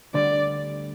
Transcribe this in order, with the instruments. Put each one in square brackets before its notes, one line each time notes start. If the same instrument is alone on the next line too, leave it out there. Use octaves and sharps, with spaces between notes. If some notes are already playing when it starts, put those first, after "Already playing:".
[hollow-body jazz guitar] D2 D3 G3 [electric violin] D5